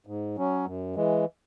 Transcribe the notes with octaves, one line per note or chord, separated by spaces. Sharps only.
G#2
F#3 C#4
F#2
E3 G#3